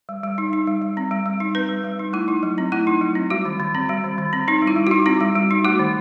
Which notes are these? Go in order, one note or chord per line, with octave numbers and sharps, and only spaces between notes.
G3
G3
D#4
D#4
G3
G3
C4
G3
G3
D#4
C4 B4
G3
G3
D#4
A3 E4
D#4
F#3
C4
A3 E4
D#4
F#3
C4
G3 F#4
D#3
D#3
C4
G3
D#3
D#3
C4
C4 D#4
G3
E4
G3
D#4 F#4
C4 F#4
G3
G3
D#4
A3 F#4
D#3